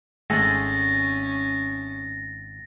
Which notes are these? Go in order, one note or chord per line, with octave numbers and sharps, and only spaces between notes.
G#1 G#3 A3 C#4 G#4 A6 A#6